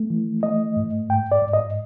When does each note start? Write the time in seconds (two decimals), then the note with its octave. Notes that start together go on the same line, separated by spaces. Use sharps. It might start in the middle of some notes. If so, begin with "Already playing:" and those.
Already playing: A3
0.10 E3
0.43 A3 D#5
0.77 G#2
1.09 G#2 G5
1.32 D5
1.42 G#2
1.53 D#5